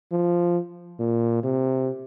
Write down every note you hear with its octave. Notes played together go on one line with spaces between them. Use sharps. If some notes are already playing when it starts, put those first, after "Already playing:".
F3
A#2
C3